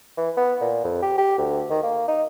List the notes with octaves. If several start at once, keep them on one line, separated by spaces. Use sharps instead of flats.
E3
B3
A#2
F2
G4
G4
D2
D#3
A#3
D#4